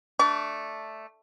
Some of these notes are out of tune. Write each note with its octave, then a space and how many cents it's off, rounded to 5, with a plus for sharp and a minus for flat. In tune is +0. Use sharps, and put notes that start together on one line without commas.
A3 +0 D4 +0 C#6 +45